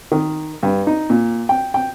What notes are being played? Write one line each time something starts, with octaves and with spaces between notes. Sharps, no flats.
D#3
G2
D#4
A#2
G5
G5